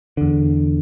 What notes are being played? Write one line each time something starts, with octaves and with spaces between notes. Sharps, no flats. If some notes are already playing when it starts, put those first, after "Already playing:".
E2 D3